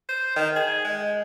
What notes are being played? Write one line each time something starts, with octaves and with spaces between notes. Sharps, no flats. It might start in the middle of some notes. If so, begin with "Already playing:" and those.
C5
D#3
G#4
G#3